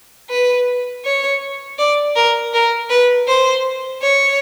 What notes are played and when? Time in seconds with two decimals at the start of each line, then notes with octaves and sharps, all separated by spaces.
0.30 B4
1.04 C#5
1.79 D5
2.15 A#4
2.53 A#4
2.90 B4
3.28 C5
4.02 C#5